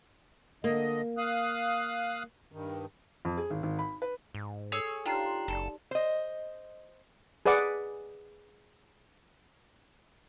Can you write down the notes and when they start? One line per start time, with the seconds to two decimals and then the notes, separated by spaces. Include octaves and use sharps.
0.64 D3 A#3 D#5
1.17 F5 D#6 F#6
2.52 G2 D#3
3.25 F2
3.37 G#4
3.50 G#1
3.63 G#1
3.79 B5
4.02 B4
4.35 G#2
4.72 G#4 A4 C#5 E6
5.06 D4 D#4 F4 G4 C#5 G5 A#5 C7
5.25 C6
5.48 F#1 D#4 A4 D5
5.91 C5 D#5
7.46 G#4 B4 D5 F#5 D6